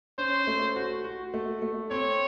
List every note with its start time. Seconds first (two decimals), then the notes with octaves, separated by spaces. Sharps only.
0.18 C#4 C5
0.47 A3
0.76 F#4
1.04 F#4
1.34 A3
1.62 A3
1.91 C4 C#5